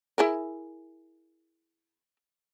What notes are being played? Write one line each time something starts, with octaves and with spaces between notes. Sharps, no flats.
E4 G#4 A#4